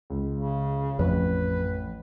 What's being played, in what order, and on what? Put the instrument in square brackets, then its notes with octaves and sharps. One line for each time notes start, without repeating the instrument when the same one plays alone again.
[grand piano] C#2
[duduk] C#3
[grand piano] A1 C#5 [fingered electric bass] F2 F3 [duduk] B4